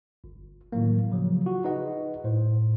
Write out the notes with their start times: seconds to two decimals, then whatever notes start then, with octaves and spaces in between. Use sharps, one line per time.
0.24 G1
0.72 A2 D#3 E3 F#3 A#3
1.12 C#3 F3 F#3
1.46 F4 F#4
1.64 D#4 G#4 B4 D#5 F#5
2.24 A2 C5